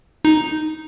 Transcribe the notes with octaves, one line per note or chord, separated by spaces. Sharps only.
D#4